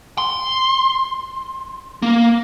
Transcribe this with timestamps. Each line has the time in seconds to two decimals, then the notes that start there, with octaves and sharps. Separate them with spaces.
0.18 C6
2.02 A#3